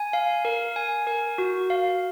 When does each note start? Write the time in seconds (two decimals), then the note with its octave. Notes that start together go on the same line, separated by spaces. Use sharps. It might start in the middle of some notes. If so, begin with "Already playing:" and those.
Already playing: G#5
0.13 F5
0.45 A#4
0.76 G#5
1.07 A#4
1.38 F#4
1.70 F5